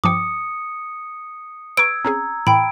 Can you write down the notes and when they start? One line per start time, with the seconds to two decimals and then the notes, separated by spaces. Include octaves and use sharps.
0.04 G2 F3 G5 D6 D#6 C#7
1.77 B4 A#5 C#6 E6 G#6 D7
2.05 C4 C#4 G#4 A#5
2.47 A2 E3 G5 B5 D7